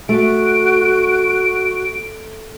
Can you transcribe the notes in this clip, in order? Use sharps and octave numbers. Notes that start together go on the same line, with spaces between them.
A3 F#4 D7